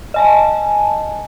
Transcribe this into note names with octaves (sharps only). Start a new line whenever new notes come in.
D#5 G#5 A5